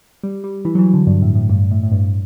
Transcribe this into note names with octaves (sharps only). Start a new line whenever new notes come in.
G3
G3
E3
F#3
E3
D3
G2
A2
A2
G2
A2
A2
G2